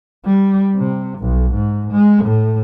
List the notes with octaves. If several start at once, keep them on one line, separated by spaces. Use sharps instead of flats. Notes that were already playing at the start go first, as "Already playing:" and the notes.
G3
C3
B1
G#2
G#3
A2